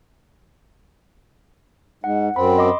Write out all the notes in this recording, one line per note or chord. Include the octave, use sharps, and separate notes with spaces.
G#2 F#5
F#2 C4 B5
D#5 C6 D6